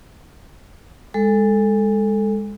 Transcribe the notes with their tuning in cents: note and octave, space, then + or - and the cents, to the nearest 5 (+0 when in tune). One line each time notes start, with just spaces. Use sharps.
G#3 -25 A4 +0